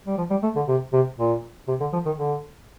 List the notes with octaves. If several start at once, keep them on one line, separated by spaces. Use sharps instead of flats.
G3
F3
G3
A3
D3
C3
C3
A#2
C3
D3
F3
D#3
D3